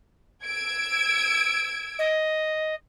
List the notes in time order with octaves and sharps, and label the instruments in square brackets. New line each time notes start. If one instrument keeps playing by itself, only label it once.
[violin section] E6 G#6 D7
[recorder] D#5